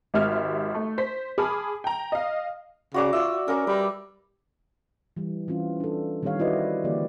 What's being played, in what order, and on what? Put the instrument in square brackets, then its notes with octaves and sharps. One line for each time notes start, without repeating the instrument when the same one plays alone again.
[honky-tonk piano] G#1 G#2 G4 E5 F6
A3
C5 B6
G#4 G#5 A5 B5 D6 F6
G5 A#5
D#5 F5
[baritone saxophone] C#3 [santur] F#4 D5 D6
[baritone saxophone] F4 [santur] E5
[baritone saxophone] C#4 [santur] A#4 D6
[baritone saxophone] G3 [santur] B4
[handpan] E3 G3
E3 C4 C#4 F4
D4 A4
D#3 G3 C4 G4 C#5 F5
E4 F#4 B4 C5 D5 D#5
D3 E3 A#3 G4 D5